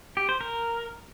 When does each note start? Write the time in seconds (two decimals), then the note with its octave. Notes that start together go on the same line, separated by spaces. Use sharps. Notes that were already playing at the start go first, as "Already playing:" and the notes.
0.17 G4
0.29 C5
0.41 A#4